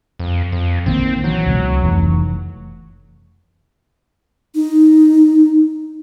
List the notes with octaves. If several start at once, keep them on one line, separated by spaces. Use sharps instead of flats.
F2
F2
A#1 D#3 A#3 C4
E3 F#3
C#2 B2 G#3
F1 E3 A3
D#4